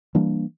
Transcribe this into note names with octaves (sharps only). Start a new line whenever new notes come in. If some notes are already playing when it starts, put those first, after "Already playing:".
E3 G3 A#3 D4